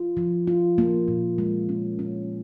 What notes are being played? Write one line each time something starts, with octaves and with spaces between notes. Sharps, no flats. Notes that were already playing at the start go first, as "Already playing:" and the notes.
Already playing: F4
F3
F4
A#3
A#2
G#3
C#4
C#4